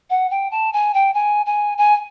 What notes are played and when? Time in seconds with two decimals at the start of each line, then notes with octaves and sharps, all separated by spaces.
0.10 F#5
0.30 G5
0.51 A5
0.73 G#5
0.94 G5
1.14 G#5
1.46 G#5
1.78 G#5